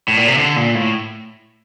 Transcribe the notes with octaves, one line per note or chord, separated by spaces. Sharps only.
A2
A#2
C3
D3
A#2
A2